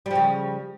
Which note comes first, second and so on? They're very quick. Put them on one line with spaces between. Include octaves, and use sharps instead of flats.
G3 F3 C#3